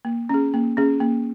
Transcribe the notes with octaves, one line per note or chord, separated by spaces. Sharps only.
A#3
C#4 G#4
A#3
C#4 G#4
A#3